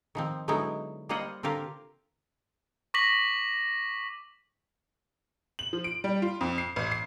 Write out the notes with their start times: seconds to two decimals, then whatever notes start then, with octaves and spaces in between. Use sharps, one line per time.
0.15 D#3 F3 C4
0.48 D3 F#3 G#3 B3 D#4 E4
1.09 G3 A#3 F4 C5 D#5 F#5
1.43 D3 C4 F4 G4 A#4 F5
2.94 C#6 D6 A#6 B6 F#7
5.59 F#7
5.73 F3
5.84 D7
6.04 G3
6.22 F4
6.41 F2
6.58 C7
6.76 A1
6.92 C7